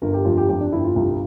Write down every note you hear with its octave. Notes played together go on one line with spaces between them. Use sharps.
G1 A#4
G4
F2 F4
G4
F2 G4
D4
G1 E4
F4
C2